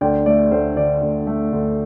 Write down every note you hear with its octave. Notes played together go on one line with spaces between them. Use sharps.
D2 D5 G5
A3 D5
D2 C5
D3 D5
D2
A3
D2